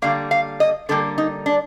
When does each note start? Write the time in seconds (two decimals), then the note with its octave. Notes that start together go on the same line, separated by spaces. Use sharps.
0.02 D3 G3 A#3 F5
0.31 F5
0.60 D#5
0.89 D3 G3 A#3 A4
1.18 D#4
1.46 D4